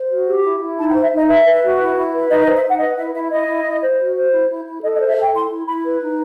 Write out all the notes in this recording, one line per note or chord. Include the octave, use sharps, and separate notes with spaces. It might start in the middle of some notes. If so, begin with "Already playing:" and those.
Already playing: C5
F#4
G4
E4
E4
D#4 A5
G5
C5
E5
D#4 D#5
B4 E5
B4
F#4
E4
E4
B4
D#4 D#5
D#5
C5
E5
D#4 F#5
B4 D#5
E4 E5
E4 E5
E4 D#5
E4
E4
C5
F#4
C5
E4
E4
E4
A4 D#5
D#5
C5
E5
A4
G5
E4 C6
E4
E4 B5
B4
D#4